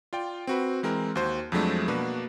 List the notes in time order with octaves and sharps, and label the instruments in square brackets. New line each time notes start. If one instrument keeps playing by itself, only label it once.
[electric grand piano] F4 D5 G5
C4 F#4 B4
E3 G#3 C4 A#4
D#2 F#4 C5
F2 F3 F#3 G#3 A3 D4
B2 A#3 D4 F#4 B4